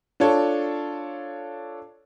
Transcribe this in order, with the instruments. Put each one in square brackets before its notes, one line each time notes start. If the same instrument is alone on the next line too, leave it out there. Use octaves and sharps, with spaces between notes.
[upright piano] D4 F4 A4 C#5